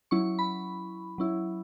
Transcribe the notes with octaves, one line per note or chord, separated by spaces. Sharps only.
F#3 C#4 E4 C#6
B5
F#3 C#4 E4